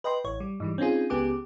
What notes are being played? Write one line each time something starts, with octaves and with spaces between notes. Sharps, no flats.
B4 D#5 G5 C6
A1 C#5
G3
G#2 E3 G3
C4 C#4 D#4 F4 G#4
C#2 C#3 B3 G4 D6